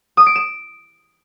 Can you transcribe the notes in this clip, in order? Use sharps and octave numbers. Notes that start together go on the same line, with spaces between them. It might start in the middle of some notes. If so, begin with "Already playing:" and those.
D#6
D7
E7